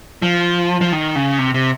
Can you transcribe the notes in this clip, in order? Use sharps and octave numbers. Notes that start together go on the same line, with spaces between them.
F3
F3
D#3
C#3
C3
C3